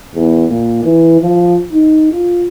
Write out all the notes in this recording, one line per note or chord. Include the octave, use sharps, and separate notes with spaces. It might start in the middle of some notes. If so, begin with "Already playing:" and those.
E2
A#2
E3
F3
D#4
F4